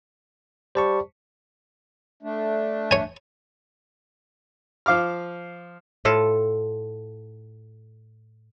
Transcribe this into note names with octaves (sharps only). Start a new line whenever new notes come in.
G3 C5 A5 C#6
A3 D4
C#5 G#5
F3 F5 D6 F6
A2 F4 A4 A5